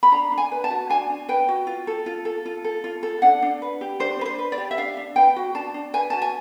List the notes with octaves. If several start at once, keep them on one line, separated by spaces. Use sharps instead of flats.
B5
D4 A#5
D4
G#5
B4
A5
F#4
D4 G#5
D4
B4 G5
F#4
F4
A4
F4
A4
F4
A4
F4
A4
D4 F#5
D4
B4
G4
D4 C5
D4 B4
C5
B4
D5
G4
E5
D4 F5
D4
B4 G5
F#4
D4 A5
D4
B4 G#5
F#4 A5
G#5